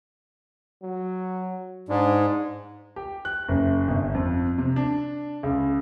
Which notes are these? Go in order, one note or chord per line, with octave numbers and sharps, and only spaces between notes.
F#3
G#2 D4
G4
F#6
F#1
G1
F2
C3
D4
C#2